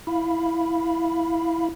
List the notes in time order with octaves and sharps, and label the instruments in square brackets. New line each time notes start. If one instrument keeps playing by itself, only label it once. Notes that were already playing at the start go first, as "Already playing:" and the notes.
[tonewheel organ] E4 F5 B5